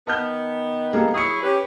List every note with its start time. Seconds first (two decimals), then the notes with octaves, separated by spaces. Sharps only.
0.07 D#3 B3 A5 F6 G6
0.93 G3 A#3 G#4 A4
1.14 F#3 E4 G#4 C#6 D#6 C#7
1.43 C#4 G4 B4